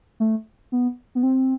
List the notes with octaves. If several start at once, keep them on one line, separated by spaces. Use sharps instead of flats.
A3
B3
B3
C4